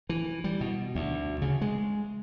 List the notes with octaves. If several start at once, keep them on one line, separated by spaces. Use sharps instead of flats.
E3
G3
B2
D2
C#3
G#3